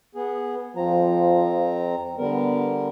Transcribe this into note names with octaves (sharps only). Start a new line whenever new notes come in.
B3 G#4
F2 F3 C4 A#5
D3 G3 B3 A#4